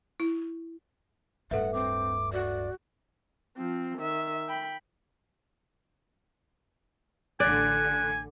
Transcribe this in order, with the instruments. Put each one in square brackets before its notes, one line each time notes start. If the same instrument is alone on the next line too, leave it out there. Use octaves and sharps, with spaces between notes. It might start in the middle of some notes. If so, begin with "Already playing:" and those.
[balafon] E4
[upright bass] D1 G2 [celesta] A4 B4 E5 [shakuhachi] F#5
[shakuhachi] C4 [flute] D6
[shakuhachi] F#4 [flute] D5
[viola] F3 C4
D#3 E5
G5 B5
[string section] A1 D3 [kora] D5 [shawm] G#5 [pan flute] F#6